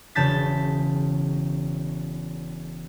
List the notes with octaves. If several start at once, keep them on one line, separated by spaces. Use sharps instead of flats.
E1 C#3 A5 G6 A6 B6